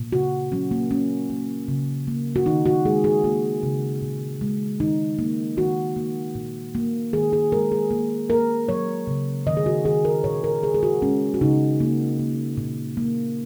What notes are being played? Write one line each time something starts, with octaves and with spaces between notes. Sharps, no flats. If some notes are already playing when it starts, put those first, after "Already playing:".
Already playing: A#2
C#3 F#4
F#3 C#4
A#3
A#3 C#4
A#3
C#3
A#3
F#4
D#3 D#4
F#4
G#3 G#4
G#4
A#3 F#4
C#3
A#2
G#3
D#3 D#4
A#3
D#3 F#4
A#3
A#2
A#3
D#3 G#4
G#4
G#3 A#4
G#4
A#3
A#3 A#4
F#3 C#5
C#3
D#3 D#5
G#4
F#4
D#3 G#4
A#4
A#2 C#5
A#4
A#2 G#4
G#4
F#4
G#3 C#4
F#4
C#3 D#4
A#3
A#3
A#2
A#3